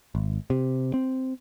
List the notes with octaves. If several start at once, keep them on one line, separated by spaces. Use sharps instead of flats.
G#1
C3
C4